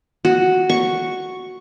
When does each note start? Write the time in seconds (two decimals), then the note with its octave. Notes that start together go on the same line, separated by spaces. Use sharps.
0.25 F#4
0.70 C#6